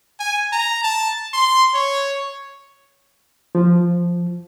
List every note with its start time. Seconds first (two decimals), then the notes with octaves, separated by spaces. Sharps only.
0.20 G#5
0.52 A#5
0.83 A5
1.34 C6
1.74 C#5
3.55 F3